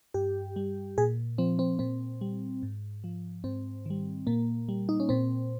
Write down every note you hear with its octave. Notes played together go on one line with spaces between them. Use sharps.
G2 G4
G3
A#2 G#4
F3 C4
C4
A#2 C4
G3
G#2
F3
G#2 C4
D#3 G3
A#2 A#3
G3
D#4
C#4
A#2 C4